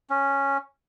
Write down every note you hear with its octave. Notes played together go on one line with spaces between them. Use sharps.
C#4